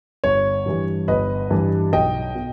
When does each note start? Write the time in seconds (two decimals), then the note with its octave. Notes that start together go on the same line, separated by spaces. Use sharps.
0.24 G1 C#5
0.66 G2 E3 G3
1.08 G1 B4 D#5
1.51 G2 E3 G3
1.93 B1 D#5 G5
2.35 B2